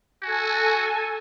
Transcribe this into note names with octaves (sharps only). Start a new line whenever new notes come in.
F#4 A4 G#5